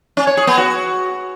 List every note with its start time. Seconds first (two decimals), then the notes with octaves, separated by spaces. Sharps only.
0.17 C#4
0.27 C#5
0.37 G#4
0.47 B3
0.57 F#4